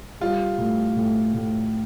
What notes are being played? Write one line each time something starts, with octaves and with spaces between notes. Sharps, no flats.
G3 F4
A2
A2
A2